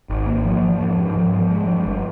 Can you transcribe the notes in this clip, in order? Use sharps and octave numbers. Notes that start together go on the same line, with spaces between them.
G#1
A#3
F3
F3
G#2
G#2
F3
F3
G#3
G2
G1